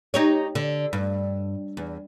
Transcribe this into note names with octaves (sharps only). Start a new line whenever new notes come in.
D#4 G4 C#5
D3
G2
E2